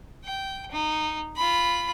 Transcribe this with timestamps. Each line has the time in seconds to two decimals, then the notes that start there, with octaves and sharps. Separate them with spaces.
0.24 G5
0.71 D#4
1.36 F4 B5